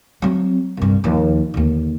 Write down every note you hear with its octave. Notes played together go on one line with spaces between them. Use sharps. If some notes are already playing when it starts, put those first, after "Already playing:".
F#3 C4
C2 G2
D#2 F3
D#2 D3